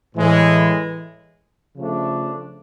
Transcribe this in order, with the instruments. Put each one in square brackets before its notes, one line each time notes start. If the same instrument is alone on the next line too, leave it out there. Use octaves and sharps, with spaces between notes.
[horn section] A2 E3 G#3
C#3 F3 A3 D4